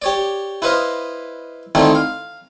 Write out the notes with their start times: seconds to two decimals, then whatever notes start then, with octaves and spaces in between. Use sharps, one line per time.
0.02 G4 C#5 D5
0.62 E4 B4 C5 D#5 F5
1.75 D3 D#3 A3 C4 D#4 E4
1.95 F5